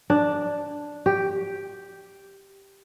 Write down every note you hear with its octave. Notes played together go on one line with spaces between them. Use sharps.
D4
G4